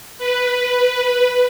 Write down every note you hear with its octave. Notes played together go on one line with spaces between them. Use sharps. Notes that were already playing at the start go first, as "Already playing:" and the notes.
B4